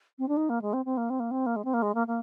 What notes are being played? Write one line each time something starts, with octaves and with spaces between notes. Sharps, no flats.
C4
D4
D#4
A#3
G#3
C4
C4
A#3
C4
A#3
C4
A#3
G#3
C4
A#3
G#3
A#3
A#3